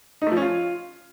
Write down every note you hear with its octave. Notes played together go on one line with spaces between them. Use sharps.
D#4
A3
F3
C#4
F4